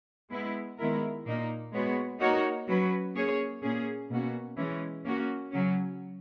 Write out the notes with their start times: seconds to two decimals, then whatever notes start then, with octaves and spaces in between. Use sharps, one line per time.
0.31 G#3 B3 E4
0.79 D#3 G#3 B3 E4 A#4
1.26 A#2 A#3 D#4
1.73 G#3 B3 F#4 C#5
2.20 A#3 D#4 F#4 A#4 C#5
2.68 F#3 C#4 F#4 B4
3.15 A#3 C#4 G#4 C#5
3.62 A#2 A#3 C#4 G#4
4.10 B2 A#3 C#4 F#4
4.57 E3 G#3 C#4
5.04 A#3 C#4 F#4
5.52 C#3 F#3 C#4